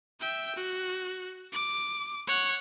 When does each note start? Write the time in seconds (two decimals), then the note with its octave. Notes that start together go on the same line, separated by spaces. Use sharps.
0.20 E5 G5
0.56 F#4
1.53 D6
2.28 C#5 F#5